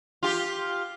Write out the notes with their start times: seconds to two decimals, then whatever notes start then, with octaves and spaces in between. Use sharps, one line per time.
0.23 F4 G4